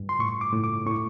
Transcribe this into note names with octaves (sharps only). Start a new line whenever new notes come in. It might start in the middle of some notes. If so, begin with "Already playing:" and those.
Already playing: G2
C6
A2 C#6
D6
A2
D6
A2 C#6